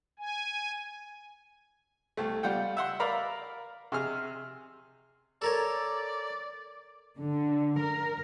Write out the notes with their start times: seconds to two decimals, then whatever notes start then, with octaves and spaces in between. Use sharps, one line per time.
0.19 G#5
2.17 C2 A3
2.43 G3 F4 F#5 G5
2.77 E5 F#5 C6
3.00 A#4 D5 F5 A#5 B5
3.92 C3 G#4 F6
5.42 A4 A#4 C#5 D5
7.18 D3
7.78 A#4